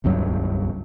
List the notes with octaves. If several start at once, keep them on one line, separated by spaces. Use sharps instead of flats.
D#1 C#2 G2 F#3